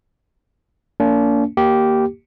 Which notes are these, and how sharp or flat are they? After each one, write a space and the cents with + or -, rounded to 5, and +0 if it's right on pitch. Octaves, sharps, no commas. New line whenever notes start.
A#3 -30 D4 -45
A#3 +0 G4 -10